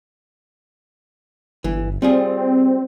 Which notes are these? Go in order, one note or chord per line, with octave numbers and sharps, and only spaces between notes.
G1 E3
G3 C4 F4 G#4